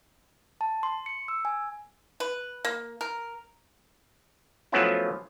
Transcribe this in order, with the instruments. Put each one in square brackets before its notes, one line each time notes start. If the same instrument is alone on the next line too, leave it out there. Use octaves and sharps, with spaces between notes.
[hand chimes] A5
C6
C#7
E6
G#5
[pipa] B4
A#3
A#4
[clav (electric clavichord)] F3 F#3 A3 B3 C#4 E4